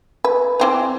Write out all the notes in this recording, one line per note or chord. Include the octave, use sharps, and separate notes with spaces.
B4
E3 C4 D#4